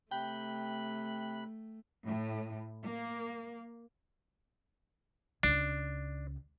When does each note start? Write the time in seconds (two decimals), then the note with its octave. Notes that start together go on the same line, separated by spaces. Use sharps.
0.11 C3 A3 G5 B5 F#6
2.05 A2
2.83 A#3
5.43 C#2 D4